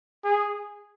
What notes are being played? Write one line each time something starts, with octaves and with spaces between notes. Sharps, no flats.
G#4